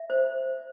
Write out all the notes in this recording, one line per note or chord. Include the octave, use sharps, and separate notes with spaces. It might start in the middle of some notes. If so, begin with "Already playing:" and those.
Already playing: E5
C5